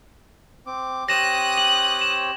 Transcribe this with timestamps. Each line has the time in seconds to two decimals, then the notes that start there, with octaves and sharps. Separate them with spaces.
0.67 C4 D6
1.09 C4 G4 C#5 D#6 F#6 A#6 E7
1.54 D#7 F#7
2.01 E7